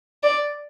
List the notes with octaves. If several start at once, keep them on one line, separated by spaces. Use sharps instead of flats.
D5